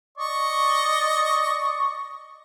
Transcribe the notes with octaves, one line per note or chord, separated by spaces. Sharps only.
D5 D#5 C#6